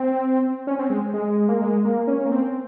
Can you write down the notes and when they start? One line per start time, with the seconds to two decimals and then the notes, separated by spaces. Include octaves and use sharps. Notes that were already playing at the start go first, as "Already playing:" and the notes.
Already playing: C4
0.67 C#4
0.79 C4
0.90 G#3
1.14 G#3
1.48 A#3
1.61 G#3
1.85 A#3
2.07 C#4
2.25 A#3
2.32 C4